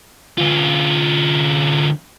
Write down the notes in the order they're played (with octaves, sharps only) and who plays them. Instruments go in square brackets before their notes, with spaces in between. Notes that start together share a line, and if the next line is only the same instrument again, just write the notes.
[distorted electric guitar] D2 F4